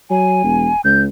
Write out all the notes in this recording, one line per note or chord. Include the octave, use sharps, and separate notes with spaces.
F#3 G#5
E1
C#2 G6